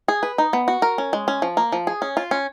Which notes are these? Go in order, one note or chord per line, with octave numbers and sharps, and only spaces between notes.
G#4
B4
D#4
B3
F#4
A#4
C#4
G#3
C#4
F3
A#3
F3
G#4
C#4
F4
C#4